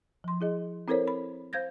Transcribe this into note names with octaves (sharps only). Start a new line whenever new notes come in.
F3 C6
E4 G#4 D#5
C4 E4 A4 A#4 C5 C#5
B5
C5 F5 G6 G#6 A#6